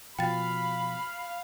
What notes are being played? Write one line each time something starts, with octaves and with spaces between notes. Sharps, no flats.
B2 F3 F5 G5 B5 A6